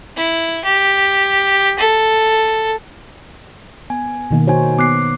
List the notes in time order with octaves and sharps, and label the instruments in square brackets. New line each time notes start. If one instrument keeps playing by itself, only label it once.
[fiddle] E4
G4
A4
[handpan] B3 [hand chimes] G#5
[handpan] B2 D#3 A#3
[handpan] D#4 C5 C#5 [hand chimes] F#4 G#5
[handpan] B3 [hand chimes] D6 F#6 C7